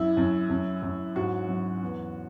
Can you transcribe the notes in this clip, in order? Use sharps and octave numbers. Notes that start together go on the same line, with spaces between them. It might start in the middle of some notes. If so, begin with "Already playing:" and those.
Already playing: F#2 E4
F#2
F#2
F#2
G#2 F#4
F#3
E2